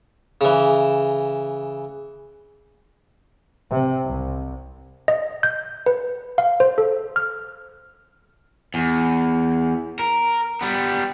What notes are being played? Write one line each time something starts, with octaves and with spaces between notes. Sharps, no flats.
C#3 E3
C3
C2
D#5
G6
B4
F5
C5
A4
F6
E2
A#4
G3 B3